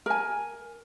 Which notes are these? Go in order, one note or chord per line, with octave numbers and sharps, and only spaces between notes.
A#4 G#5